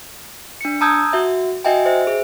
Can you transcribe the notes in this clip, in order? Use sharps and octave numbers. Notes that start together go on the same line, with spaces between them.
D4 C#7
A5 A#5 D#6 E6 G6 G#6
F#4 E5
F#4 D#5 E5 G5 G#5
C5 E5
G#4